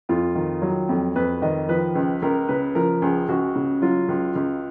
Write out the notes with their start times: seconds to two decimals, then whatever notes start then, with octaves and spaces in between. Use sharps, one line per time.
0.09 F2 F4
0.35 D#3
0.62 F#3
0.89 F2
1.16 F2 B4
1.42 D#3 D#5
1.69 F3 B4
1.95 C#2
2.22 C#2 A#4
2.49 C#3 B4
2.75 F3 A#4
3.02 C#2 G#4
3.29 C#2 F#4
3.56 C#3
3.82 F#3 F4
4.09 C#2
4.36 C#2